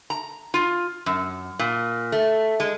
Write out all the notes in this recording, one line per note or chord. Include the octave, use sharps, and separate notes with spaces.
A#5
F4
F#2
A#2
A3
G#3